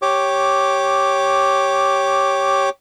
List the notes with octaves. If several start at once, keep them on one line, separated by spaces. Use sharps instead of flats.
G4 C#5 D6